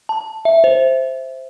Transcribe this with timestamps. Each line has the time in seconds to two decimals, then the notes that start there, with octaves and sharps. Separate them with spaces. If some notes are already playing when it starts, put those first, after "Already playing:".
0.09 A5
0.45 E5
0.64 C5